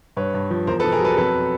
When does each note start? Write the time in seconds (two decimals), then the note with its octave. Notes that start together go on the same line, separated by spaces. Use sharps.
0.17 G2 B4 C#5
0.34 G2
0.51 F3
0.67 E2 A#4 C5
0.80 A4 B4
0.84 B2
0.92 G#4 A#4
1.01 F#3 A4 B4
1.17 F2 A4 B4